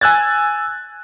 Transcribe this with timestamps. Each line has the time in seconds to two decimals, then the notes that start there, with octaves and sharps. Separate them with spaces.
0.01 G#5 E6 F#6 G#6 A6